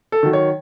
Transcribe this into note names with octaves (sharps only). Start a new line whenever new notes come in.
A4
D#3 F#3
C#5